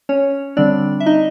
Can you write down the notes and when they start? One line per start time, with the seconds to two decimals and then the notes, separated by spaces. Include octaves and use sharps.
0.09 C#4 C#5
0.57 D3 G3 C4 D4 D5
1.00 E5
1.06 D#4 D#5